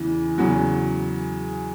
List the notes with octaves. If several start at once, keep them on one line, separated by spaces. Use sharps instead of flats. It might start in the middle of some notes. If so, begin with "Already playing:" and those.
Already playing: E2 C#3 E3
E2 C#3 F#3